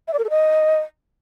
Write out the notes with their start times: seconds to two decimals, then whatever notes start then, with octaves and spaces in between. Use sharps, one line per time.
0.08 E5
0.13 D5
0.19 A#4
0.24 A4
0.30 D#5